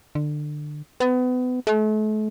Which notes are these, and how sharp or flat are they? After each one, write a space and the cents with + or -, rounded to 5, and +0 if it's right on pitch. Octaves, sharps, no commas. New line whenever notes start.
D3 +25
B3 +30
A3 -40